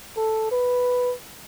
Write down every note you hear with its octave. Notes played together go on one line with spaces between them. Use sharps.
A4
B4